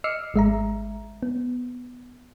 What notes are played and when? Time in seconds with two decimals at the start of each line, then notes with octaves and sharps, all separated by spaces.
0.04 D#5 D6 E6 F6 C7 C#7
0.34 G#1 G#3 E5 A#5
1.23 B3